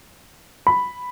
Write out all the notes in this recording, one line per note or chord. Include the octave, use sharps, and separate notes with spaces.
B5